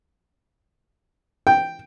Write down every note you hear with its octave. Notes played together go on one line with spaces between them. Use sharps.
G5